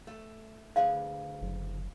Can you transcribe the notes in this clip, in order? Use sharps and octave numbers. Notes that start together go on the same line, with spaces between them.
A3
D2 G#4 B4 F5
F#1